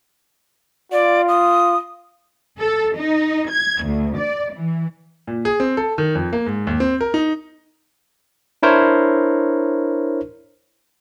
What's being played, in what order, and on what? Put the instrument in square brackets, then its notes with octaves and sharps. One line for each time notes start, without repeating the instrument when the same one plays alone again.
[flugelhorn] F4 [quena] D5
[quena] D#6
[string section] A4
D#4
G#6
D2
D5
E3
[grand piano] A#2
G#4
C4
A4
D#3
F2
A#3
G#2
D#2
C4
A#4
D#4
[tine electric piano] D4 E4 A#4 C5 C#5